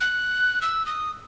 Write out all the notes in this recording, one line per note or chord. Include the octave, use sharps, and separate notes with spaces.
F#6
E6
D#6